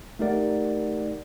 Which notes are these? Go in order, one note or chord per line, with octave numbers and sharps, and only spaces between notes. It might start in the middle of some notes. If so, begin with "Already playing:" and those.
A3 D#4 G4 A#4 D5 F#5